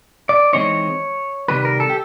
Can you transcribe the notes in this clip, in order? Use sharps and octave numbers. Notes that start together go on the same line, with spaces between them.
D5
E3 G#3 C4 D#4 C#5
C3 D#3 G3 B4
A#4
A4
G4